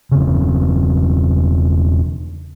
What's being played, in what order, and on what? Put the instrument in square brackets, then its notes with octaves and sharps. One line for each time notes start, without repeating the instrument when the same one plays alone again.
[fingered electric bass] E1 C#3